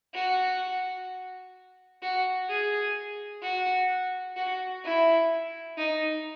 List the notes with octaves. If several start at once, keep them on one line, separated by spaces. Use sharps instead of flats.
F#4
F#4
G#4
F#4
F#4
E4
D#4